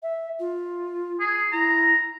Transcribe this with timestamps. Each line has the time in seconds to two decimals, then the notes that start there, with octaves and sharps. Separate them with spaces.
0.03 E5
0.39 F4
1.20 G#4
1.52 E4 A#5